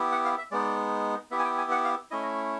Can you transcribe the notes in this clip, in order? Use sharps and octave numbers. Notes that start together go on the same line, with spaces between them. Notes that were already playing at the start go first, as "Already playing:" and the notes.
Already playing: B3 E4 G4
F#5
F5
E5
G#3 B3 D#4 D5
B3 E4 G4 E5
G#5
G5
G#5
F#5
F5
A3 C#4 E4 D#5